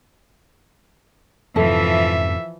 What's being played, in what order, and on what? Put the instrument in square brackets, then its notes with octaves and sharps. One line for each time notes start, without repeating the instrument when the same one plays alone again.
[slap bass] F2 G#2 C3 [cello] E3 F3 [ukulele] A4 [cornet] E5